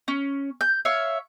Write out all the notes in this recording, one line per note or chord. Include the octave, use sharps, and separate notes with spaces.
C#4
G6
C#5 E5 F5